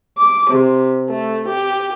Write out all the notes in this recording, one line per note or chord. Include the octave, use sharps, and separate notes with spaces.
D6
C3
A3
G4